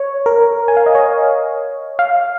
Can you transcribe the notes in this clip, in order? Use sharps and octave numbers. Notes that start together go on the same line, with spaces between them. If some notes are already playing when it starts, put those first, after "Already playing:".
Already playing: C#5
A#4
G#5
F5
D#5
C#5
F5